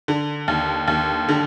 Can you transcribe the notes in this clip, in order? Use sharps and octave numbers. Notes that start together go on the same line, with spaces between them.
D3
D#2
D#2
D3